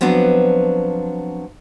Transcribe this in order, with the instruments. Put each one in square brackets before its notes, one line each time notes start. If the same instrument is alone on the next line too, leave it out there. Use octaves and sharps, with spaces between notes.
[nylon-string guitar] F3 F#3 B3 C4 D4